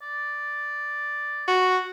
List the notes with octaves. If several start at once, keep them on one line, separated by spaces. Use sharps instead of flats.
D5
F#4